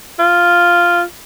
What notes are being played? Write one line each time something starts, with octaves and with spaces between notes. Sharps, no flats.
F4